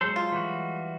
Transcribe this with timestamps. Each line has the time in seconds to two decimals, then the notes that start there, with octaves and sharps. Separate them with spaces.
0.01 F#3 G#3 A4 C5
0.16 F4
0.32 E3 G3 F#4